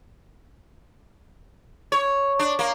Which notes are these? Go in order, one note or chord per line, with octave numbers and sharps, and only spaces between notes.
C#5
D4
A#3